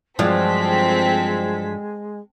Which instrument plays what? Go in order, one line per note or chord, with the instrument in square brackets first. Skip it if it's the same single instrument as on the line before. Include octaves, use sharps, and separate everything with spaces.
[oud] G2 F3 F#3 [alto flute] G#3 [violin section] C4 A4 B6